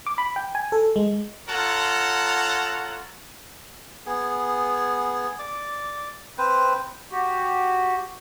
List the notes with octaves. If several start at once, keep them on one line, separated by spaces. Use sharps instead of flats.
D6
B5
G5
G#5
A4
G#3
F4 A4 C#5 F#5 A5 A#5
B3 G#4
D5 D6
C4 B4 C5
F#4 G4